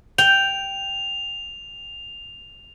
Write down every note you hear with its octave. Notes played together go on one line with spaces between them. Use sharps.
G5 F7